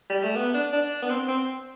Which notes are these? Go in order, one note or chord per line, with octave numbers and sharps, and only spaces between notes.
G3
A3
B3
D4
D4
B3
C4
C4